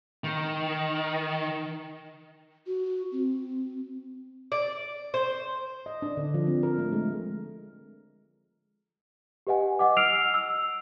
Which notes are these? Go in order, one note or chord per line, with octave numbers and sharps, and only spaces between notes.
D#3
F#4
C4
D5
C5
D#5
D4
D3
F3
C4
A#4
A3
G#3
G4 B4 D#5 F#5 G#5
D#5 F#5 D6
E6 F6 C7 D7 F7
E6